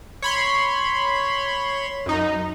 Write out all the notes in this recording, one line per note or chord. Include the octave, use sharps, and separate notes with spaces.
C#5 B5 C6
F#2 D#4